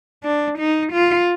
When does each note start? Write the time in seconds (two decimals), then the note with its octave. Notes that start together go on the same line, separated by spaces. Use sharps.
0.24 D4
0.59 D#4
0.93 F4